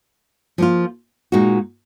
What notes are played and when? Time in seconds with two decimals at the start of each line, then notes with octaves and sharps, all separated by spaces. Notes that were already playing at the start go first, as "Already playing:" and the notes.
0.58 F3 A#3 F4
1.32 A#2 G#3 D#4 F#4